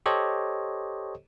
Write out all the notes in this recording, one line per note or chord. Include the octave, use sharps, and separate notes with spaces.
G4 A4 C5 C#5 D#5